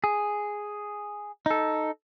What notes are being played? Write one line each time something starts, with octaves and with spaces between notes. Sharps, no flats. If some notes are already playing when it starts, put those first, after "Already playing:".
G#4
D#4 A4